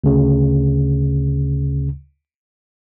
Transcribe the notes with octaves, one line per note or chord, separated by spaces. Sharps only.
D2 C#3